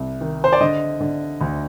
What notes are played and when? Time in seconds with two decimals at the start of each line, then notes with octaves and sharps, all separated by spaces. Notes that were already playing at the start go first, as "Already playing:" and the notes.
Already playing: C2
0.21 D#3
0.44 C5
0.53 D5
0.60 D3 D#5
1.00 D3
1.41 D2